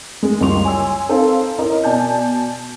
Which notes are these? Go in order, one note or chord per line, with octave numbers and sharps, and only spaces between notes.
G#3
F#1 C#2 G3 C6 C#6 F7
C#5 G#5 C6 E6
C4 D#4 A4 C5 F5
C#4 E4 A#4 D#5
B2 D5 G#5 A5 G6